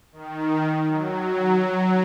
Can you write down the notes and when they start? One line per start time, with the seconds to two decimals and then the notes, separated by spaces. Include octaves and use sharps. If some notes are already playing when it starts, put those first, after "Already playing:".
0.12 D#3
0.86 F#3